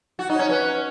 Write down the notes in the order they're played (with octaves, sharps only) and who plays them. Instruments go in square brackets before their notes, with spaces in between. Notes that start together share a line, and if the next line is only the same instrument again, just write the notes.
[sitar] F#4
D#4
[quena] C#5
[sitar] C#4
[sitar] C#4 [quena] B4